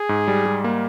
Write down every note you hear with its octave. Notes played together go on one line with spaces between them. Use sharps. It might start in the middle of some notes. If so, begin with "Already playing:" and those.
Already playing: G#4
G#2
G3
G3
A#3